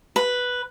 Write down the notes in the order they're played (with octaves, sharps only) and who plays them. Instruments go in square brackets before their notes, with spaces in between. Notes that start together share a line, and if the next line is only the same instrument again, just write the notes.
[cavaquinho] B4